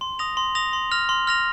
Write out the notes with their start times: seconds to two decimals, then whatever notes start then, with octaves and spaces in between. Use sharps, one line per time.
0.01 C6
0.19 D#6 A#6 F7
0.37 C6
0.55 D#6 A#6 F7
0.73 C6
0.91 F6 A#6 F7
1.09 C6
1.27 F6 A#6 F7